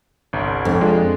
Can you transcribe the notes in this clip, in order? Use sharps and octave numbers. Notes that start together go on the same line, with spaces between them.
G1 C2
F2
G#3 D4 F4